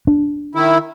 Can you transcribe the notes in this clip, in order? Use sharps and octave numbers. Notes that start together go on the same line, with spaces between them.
D4
D#3 E4